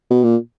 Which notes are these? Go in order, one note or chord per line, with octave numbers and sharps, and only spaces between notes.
B2
A#2